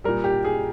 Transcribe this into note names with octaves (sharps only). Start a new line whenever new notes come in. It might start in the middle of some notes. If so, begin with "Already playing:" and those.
A#2 G3 A#4
G4
G#4